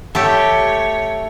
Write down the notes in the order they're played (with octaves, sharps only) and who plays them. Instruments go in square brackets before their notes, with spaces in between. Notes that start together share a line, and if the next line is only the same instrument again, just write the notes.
[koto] A3 G4 [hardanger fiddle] C#5